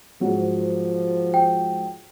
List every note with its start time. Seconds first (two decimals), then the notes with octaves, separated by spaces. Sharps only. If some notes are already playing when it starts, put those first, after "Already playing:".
0.21 G#2 F3 F#3
1.34 G5